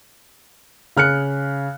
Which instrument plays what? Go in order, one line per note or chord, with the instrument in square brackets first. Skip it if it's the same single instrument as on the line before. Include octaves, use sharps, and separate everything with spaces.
[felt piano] C#3 F6 F#6 C#7